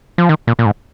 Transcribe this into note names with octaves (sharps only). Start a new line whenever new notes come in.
F3
D#3
A#2
A#2
G#2